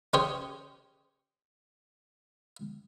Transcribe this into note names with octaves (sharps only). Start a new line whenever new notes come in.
C#4 G4 G#4 C5 C#5